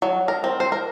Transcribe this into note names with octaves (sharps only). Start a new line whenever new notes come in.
F#3
A#4
C4
C5
A#4